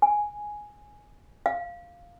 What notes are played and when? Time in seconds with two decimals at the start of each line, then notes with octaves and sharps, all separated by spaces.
0.02 G#5
1.46 F5